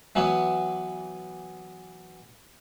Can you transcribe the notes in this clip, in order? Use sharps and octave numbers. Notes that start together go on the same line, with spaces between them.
E3 F#3 B3 E4